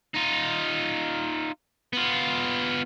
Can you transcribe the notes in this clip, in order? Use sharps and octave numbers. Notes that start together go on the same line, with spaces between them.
D#4 F4
B3 F4